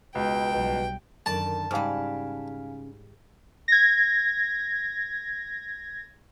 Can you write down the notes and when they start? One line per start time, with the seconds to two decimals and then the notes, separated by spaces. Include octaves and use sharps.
0.15 C#2 B2 G5
0.54 B1 B2 G3
1.26 F#2 D3 D#3 D5 A5
1.71 G#2 C#3 G3 C#4 F5 G#5 F6
3.68 G#6 A#6